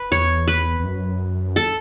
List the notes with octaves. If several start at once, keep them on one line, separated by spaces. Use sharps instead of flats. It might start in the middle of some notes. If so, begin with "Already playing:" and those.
Already playing: B4
E2 C#5
B4
E2
F#2
A4